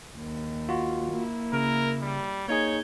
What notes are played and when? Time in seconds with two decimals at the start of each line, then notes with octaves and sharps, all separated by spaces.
0.17 D#2
0.69 F4 F#4
1.11 A#3 E4
1.53 C#3 A#4
2.02 G3
2.48 A#3 D#4 G#4 C#5 G6 G#6